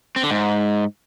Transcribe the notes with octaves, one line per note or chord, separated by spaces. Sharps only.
C4
D3
G#2